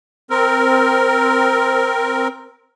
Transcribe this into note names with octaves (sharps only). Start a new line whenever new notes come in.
C4 A#4